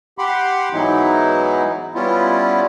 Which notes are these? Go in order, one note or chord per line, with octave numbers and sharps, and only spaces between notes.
G4 F#5 B5 C6 D6
G#2 E3 F#3 B3 D#4 E4
G3 B3 C#4 E4 F4